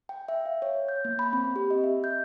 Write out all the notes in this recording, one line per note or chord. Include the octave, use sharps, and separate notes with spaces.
G5
E5
F5
C#5
G6
A#3
B5
C4
G4
D#5
E5
G6